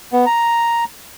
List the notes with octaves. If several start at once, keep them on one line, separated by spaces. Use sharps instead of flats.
B3
A#5